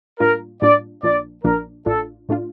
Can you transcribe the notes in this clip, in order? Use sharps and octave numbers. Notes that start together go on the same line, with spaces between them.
A2 G3 A#3 D4 F4 A#4
A2 G3 A#3 D4 F4 D5
A#1 A#2 F3 A#3 D4 D5
A#1 A#2 F3 A#3 D4 A#4
A1 A2 A3 D4 F4 A4
A2 A3 D4 F4